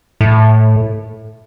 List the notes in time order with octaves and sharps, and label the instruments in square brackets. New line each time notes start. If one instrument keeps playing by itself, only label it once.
[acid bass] A2